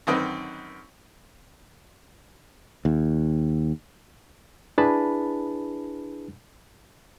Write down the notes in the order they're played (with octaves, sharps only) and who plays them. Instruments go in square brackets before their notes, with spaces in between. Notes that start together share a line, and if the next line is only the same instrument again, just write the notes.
[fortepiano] F#2 D3 D#3 C4 B4 D#5
[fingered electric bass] D#2
[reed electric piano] D4 E4 G#4 B4 A5 B5